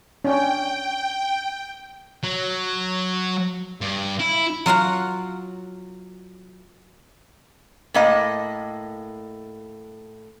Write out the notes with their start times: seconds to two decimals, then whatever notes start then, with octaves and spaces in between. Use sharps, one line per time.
0.25 C#4 D4 G5
2.24 F#3
3.81 G2
4.20 E4
4.66 F#3 F4 F5 F#5
7.94 A2 A#3 D#5